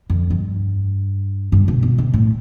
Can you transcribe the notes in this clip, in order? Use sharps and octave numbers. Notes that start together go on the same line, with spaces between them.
F2
G2
G2
B2
B2
C3
A2